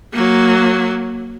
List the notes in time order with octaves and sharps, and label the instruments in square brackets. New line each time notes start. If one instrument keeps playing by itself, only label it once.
[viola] F#3 A#3